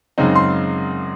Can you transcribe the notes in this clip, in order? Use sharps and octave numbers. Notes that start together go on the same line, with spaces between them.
F#2 C#3 G#3 C4 D#4
C6